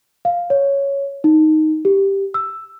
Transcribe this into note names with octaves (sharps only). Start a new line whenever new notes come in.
F5
C#5
D#4
G4
E6